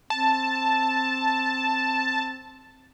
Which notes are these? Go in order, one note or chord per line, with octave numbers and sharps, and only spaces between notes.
C4 A5